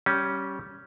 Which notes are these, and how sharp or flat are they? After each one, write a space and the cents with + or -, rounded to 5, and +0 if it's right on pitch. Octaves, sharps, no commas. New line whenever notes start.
G3 -15 C#4 +0